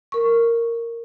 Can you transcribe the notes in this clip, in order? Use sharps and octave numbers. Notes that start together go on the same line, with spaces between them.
A#4 C#6